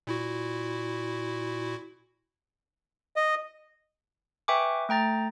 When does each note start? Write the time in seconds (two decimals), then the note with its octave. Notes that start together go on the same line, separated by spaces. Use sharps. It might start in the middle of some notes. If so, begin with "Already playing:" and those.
0.07 A#2 E4 F#4
3.16 D#5
4.48 B4 E5 G5 G#5 C#6 D6
4.89 A3 G5 A#5 A6